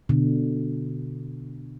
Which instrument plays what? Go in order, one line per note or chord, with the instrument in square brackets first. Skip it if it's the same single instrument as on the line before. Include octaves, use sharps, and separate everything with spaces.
[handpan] B2 D3